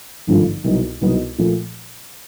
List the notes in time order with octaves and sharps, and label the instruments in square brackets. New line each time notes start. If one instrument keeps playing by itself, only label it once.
[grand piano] G#1 G2 D3 F3 A3
C2 B2 F#3 B3 D#4
C2 B2 F#3 B3 D#4
A#2 F3 A3